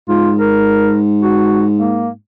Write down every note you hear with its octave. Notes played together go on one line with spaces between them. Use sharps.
G#2 F4
A#4
F#4
A#3